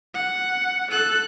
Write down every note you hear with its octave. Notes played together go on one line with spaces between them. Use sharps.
F#5
A4 F#6